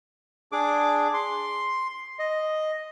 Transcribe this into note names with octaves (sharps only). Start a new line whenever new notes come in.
D4 G#4 D6
C6
D#5